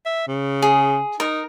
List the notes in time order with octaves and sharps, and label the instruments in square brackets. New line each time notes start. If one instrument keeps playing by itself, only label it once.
[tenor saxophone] E5
C#3
[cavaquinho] G#4
[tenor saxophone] D#4 [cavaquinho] A#4